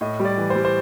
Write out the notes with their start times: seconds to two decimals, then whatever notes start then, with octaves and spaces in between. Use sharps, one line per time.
0.01 A2 D#5
0.20 G3
0.25 D5
0.38 E3
0.50 C5
0.56 G3
0.65 C5